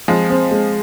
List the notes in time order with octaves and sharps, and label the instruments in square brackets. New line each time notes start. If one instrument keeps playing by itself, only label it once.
[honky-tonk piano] F3 G#3 [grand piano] C4
[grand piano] C4
G#3